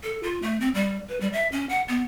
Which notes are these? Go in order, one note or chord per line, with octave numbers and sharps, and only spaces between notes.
A4
F4
A3
C4
G3
B4
G3
E5
C#4
F#5
B3